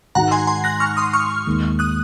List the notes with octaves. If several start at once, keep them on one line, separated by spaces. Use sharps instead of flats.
G#2 D#3 G#3 D#4 F#4 F#5 A#5
G#5 C6
G#5 C6
F#6 A#6
C#6 F6
C6 D#6
C#6 F6
D#2 D#3 G#3
D#6 F#6